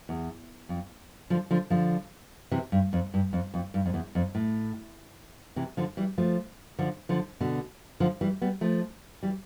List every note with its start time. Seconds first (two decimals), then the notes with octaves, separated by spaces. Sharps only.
0.09 E2
0.69 F2
1.30 D3 F3
1.51 D3 F3
1.70 D3 F3
2.51 C3 E3
2.72 G2
2.93 F2
3.14 G2
3.33 F2
3.54 F2
3.74 G2
3.86 F2
3.94 E2
4.15 F2
4.35 A2
5.56 C3 E3
5.77 D3 F3
5.97 E3 G3
6.18 F3 A3
6.79 D3 F3
7.09 D3 F3
7.40 B2 D3
8.00 D3 F3
8.21 E3 G3
8.42 G3 B3
8.61 F3 A3
9.23 E3 G3